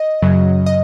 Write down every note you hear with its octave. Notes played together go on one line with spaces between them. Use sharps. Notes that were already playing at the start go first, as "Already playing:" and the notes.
Already playing: D#5
F#2 C#3 F#3
D#5